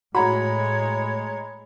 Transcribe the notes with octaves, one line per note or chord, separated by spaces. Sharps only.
A2 G#3 F#4 C#5 A#5 B5